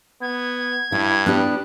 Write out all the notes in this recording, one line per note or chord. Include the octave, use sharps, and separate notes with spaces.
B3 G#6
G2 E4
B3 D4 G4 F#6